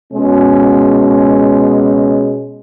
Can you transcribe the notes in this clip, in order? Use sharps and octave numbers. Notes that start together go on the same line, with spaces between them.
B2 G#3 C#4